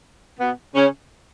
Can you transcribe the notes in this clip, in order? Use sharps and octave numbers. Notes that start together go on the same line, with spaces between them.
B2 B3
C#3 C#4